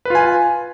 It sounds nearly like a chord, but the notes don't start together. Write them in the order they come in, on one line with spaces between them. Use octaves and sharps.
B4 F4 G#5